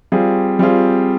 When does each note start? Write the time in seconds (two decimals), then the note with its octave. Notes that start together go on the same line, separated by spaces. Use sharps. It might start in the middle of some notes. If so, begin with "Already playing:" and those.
0.12 G3 C4 F4 G#4
0.59 G3 C4 F4 G#4